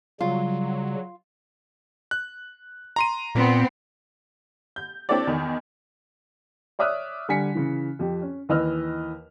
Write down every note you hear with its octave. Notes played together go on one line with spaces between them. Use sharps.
C#3 F#3 G3 F4
F#6
A#5 C6 D#7
A#2 B3 C4
G6
C4 D4 E4 A4 C#5 D5
E2 D#3
C#5 D5 E5 D#6 F6 F#6
D3 G3 G#5 B6 C#7
C#3 E3
F2 G4
C#4
D#2 E3 B4 D#5 E6 F6